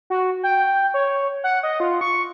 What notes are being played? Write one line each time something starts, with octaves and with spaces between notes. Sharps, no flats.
F#4
G5
C#5
F#5
D#5
F4
C#6